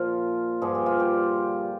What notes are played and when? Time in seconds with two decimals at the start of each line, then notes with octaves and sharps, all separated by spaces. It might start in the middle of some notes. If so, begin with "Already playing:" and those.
Already playing: A#2 F3 F4
0.62 G2 D3 F3 G#4
0.75 G4
0.86 F4
1.00 G4